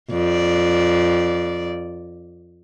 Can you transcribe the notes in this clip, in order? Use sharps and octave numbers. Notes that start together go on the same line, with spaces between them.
F2 D5